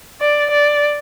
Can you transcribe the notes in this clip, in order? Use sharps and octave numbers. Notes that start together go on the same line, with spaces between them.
D5
D5